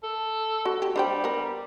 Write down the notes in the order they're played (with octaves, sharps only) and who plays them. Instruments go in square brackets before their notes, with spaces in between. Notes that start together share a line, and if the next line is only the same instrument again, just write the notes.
[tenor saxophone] A4
[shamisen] F#4
G4
[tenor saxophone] G3 [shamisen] D4 C5 G5
[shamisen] B3 A#4